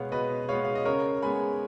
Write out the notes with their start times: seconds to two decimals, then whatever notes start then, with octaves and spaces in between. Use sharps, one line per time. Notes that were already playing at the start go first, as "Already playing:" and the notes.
Already playing: B2 G#3 B3 C#5 F5
0.12 B2 B4 D#5
0.49 G#3 B3 C#5 F5
0.65 F5
0.75 D#5
0.85 C#3 A#4 C#5
1.22 G#3 B3 G#5 B5